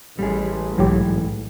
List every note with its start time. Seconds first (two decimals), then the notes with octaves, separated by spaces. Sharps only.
0.19 A1 G3 G#4
0.78 B1 G#2 E3 F#3 G4